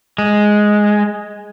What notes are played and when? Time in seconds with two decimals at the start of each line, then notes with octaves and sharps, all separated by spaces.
0.18 G#3